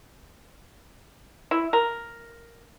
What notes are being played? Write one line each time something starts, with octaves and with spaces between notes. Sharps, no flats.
E4
A#4